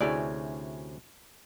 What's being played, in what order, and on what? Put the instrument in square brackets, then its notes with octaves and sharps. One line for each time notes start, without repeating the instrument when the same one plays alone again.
[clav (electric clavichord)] D2 C3 C#4 [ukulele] E4 G#4 D5